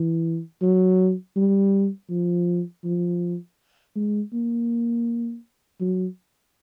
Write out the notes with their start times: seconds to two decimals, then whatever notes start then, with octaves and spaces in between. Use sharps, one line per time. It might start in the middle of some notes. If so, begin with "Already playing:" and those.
Already playing: E3
0.61 F#3
1.36 G3
2.10 F3
2.84 F3
3.96 G#3
4.33 A#3
5.81 F#3